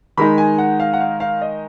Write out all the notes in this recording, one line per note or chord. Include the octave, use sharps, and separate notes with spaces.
D#3 G#3 D#4 B5
G#5
F#5
F5
F#5
F5
F5
D#5